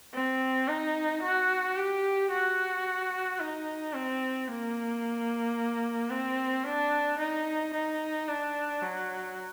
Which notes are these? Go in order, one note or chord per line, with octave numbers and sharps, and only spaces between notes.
C4
D#4
F#4
G4
F#4
D#4
C4
A#3
C4
D4
D#4
D#4
D4
F#3